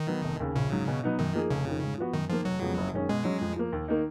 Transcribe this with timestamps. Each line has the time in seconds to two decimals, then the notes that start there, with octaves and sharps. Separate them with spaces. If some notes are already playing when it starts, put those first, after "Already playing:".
Already playing: D#3
0.08 F#3 B3
0.24 F1
0.40 D#2 C#3
0.55 A#1 C#3
0.72 G#2 F#3
0.88 B2
1.03 F#3 B3 D#4
1.19 F#2 D#3
1.35 F3 A#3 D#4 G#4
1.51 F1 C#3
1.67 F2 D#3
1.83 G#2
1.98 F3 B3 F#4
2.13 F#2 D#3
2.30 D#3 F3 A#3
2.45 F1 F#3
2.61 F2 C#3 G#3 B3
2.77 F#1
2.93 F#2 D#3 G#3 C#4
3.09 B2 G#3
3.24 F#3 C#4
3.41 F2
3.56 F3 A#3
3.73 D#2
3.88 D#3 A#3 D#4